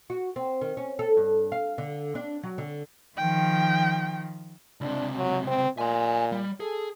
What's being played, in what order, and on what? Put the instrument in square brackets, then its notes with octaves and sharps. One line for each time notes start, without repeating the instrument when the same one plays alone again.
[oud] F#4
C4
D#3
C#4
A4
G2
F5
D3
D4
F#3
D3
[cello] D#3 F3 [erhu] G5
[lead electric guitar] C#2 C3 [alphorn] D4
[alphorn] F#3
C4
[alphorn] A#2 [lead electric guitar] G#5 C6
[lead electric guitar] G3
[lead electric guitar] G#4 [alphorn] A4